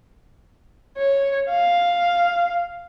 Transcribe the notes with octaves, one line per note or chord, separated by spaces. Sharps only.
C#5
F5